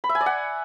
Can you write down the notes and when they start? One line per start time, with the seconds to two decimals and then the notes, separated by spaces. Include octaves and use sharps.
0.04 B5
0.09 E5
0.15 G#5
0.21 D5
0.26 F#5